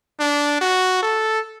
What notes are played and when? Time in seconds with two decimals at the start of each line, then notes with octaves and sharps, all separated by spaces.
0.20 D4
0.61 F#4
1.03 A4